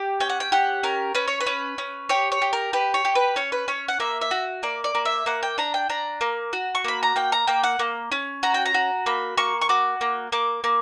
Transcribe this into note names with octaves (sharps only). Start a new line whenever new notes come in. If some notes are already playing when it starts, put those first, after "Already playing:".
Already playing: G4
C#4 G5
F#5
G5
G4 F#5
C#4 A#4
C#4 B4
C#5
B4
C#4
C#4
G4 C#5
C#5
G4
A#4
G4 B4
C#5
G4
B4
C#4 C#5
B4
C#4 C#5
F#5
A#3 E5
E5
F#4
A#3 D5
D5
A#3
E5
A#3 F#5
G5
D4 A#5
G5
D4 A#5
A#3
F#4
C#6
A#3 B5
A#5
A#3 G5
A#5
A#3 G5
F#5
A#3
C#4
F#4 A#5
G5
A#5
F#4
A#3 B5
A#3 C#6
C#6
F#4 D6
A#3
A#3 D6
A#3